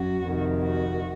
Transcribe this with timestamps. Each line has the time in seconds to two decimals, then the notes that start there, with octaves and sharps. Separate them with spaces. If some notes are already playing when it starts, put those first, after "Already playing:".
Already playing: F#2 F#4
0.26 F2 C3 D#3
0.63 F#4